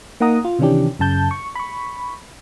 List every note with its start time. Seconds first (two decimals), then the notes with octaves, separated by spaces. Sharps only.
0.20 A#3 D#4 F#5 A#5 D#6
0.45 F4
0.59 C3 D#3 E3 C#4 D4 G4
0.99 F#2 C#3 A5 G6
1.31 C#6
1.55 B5 C#6